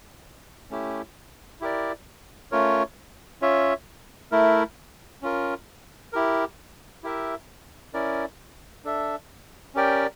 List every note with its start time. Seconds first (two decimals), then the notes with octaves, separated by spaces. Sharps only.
0.70 A3 C#4 E4 G4
1.61 E4 G4 A#4 D5
2.52 A3 C#4 F4 A#4 C#5
3.41 C#4 F4 C#5 E5
4.32 A3 E4 A#4
5.22 C#4 F4 A#4
6.13 E4 G4 A#4
7.03 E4 G4 A#4 E5
7.93 C#4 E4 A#4 D5
8.84 D4 A4 E5
9.74 C#4 G4 A#4 D5 G5